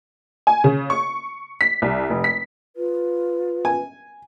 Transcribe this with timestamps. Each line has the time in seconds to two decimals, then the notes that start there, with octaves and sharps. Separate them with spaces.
0.47 G#5
0.64 C#3
0.90 C#6
1.61 B6
1.82 C2
2.10 F1
2.24 B6
2.76 F4 B4
3.65 G#5